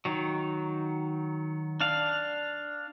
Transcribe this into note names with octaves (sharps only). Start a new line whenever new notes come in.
D#3 F#3
D4 F5